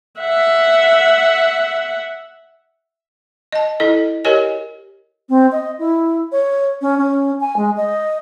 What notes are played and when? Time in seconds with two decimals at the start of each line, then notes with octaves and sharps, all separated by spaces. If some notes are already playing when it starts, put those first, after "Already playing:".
0.20 E5 F#5
3.52 D#5 A5
3.80 E4 A4 D#5
4.24 G4 A#4 C#5 D#5 G#5
5.29 C4
5.52 D#5
5.79 E4
6.32 C#5
6.81 C#4
6.98 C#4
7.41 G#5
7.57 G#3
7.77 D#5